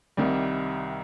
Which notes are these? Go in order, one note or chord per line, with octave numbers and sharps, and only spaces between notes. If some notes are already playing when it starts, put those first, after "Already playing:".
C2 C3 D#3 G3 D5